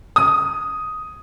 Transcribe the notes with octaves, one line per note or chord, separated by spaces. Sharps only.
D#6